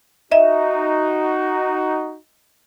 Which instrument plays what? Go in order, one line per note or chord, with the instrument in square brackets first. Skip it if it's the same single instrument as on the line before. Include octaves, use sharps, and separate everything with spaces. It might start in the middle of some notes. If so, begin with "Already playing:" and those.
[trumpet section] D#4 F#4 [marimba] D#5 E5